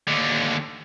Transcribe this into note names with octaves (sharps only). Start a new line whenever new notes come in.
D#2 D3